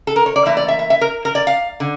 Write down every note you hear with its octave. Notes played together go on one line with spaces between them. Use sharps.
A4
A#4
C#5
D5
A2 E3 A#3 E4 E5
D5
E5
E5
E5
A#4
A#4
D5
F5
D3